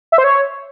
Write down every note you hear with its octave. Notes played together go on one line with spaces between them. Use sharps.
E5
C5
C#5